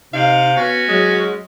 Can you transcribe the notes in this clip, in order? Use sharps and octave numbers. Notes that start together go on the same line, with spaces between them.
C3 D#4 F5
B3 C#4 F#4
F#3 G#3